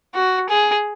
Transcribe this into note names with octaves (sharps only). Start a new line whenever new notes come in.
F#4
G#4